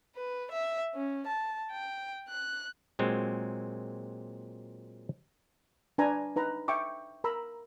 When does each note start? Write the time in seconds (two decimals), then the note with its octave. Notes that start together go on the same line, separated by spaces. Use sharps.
0.16 B4
0.52 E5
0.95 C#4
1.27 A5
1.71 G5
2.29 F#6
2.99 A#2 F#3 G#3 C4
5.98 D4 B4 G#5 A#5
6.36 D#4 B4 A#5
6.68 E5 G5 C#6 D6
7.24 A#4 A#5 B5 E6